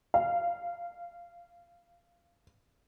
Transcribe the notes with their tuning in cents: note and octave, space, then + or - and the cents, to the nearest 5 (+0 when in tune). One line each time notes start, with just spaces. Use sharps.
F5 -15